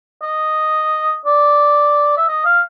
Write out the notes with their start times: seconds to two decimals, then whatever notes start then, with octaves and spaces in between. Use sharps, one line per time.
0.22 D#5
1.25 D5
2.17 E5
2.28 D#5
2.45 F5